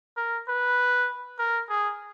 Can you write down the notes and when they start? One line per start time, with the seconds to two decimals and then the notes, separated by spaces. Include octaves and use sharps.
0.17 A#4
0.48 B4
1.39 A#4
1.70 G#4